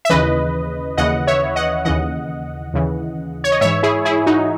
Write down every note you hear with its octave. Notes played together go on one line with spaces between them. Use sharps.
E5
D#2 C#3 E3 B4 D#5
D#2 C#3 E3 D#5 F#5
C#5 E5
D#5 F#5
D#2 C#3 E3 D#5 F#5
D#2 C#3 E3
C#5
D#5
G#2 E3 C#5 E5
E4 G#4
E4 G#4
D#4 F#4